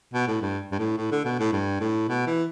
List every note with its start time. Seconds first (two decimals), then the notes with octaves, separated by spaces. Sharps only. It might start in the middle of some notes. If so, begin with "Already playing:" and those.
0.14 B2
0.28 A2
0.42 G2
0.72 G2
0.79 A2
0.97 A2
1.11 D3
1.25 B2
1.39 A2
1.52 G2
1.81 A2
2.09 B2
2.27 E3